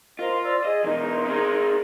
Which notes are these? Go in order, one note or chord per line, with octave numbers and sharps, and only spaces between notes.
F4 A#4 C5 D#5
C5 D5 E6
G#4 D#5
B2 E3 D#4 A#4 C6
C4 G#4